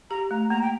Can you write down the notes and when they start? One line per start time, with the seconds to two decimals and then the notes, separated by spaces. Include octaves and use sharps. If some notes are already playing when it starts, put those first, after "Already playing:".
0.10 G4 A#5
0.31 A3 A#5
0.50 A#3 A#5
0.62 G5